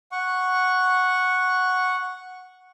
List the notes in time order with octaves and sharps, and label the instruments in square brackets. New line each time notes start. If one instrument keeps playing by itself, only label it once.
[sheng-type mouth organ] F#5 C#6